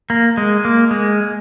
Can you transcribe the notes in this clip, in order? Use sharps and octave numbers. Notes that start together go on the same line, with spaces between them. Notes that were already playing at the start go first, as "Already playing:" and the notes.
A#3
G#3
A#3
G#3